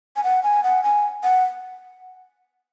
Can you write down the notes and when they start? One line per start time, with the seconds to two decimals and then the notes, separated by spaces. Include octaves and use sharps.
0.16 G#5
0.24 F#5
0.43 G#5
0.64 F#5
0.83 G#5
1.23 F#5